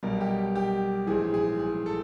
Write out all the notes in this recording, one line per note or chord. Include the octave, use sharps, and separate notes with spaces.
B1 B2 G3 A#4
G4
G4
A#1 G#2 E3 G#4
G#4
G#4
A4